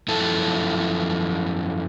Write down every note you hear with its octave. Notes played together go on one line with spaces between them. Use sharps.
F#2 F3 E4 A4 A5